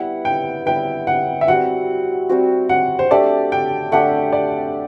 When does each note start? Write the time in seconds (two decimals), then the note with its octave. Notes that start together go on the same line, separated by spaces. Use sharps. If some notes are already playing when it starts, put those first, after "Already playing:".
Already playing: G3 B3 E4 B4 F#5
0.25 G5
0.66 G3 B3 E4 B4 G5
1.07 F#5
1.41 E5
1.48 G3 C4 F#4 F#5
2.29 G3 C4 F#4
2.69 F#5
2.99 C5
3.11 A3 D4 G4 D5
3.52 G5
3.92 A3 D4 G4 F#5
4.33 D5